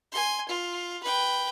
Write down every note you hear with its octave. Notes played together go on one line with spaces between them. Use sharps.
G#5 C6
F4
B4 G5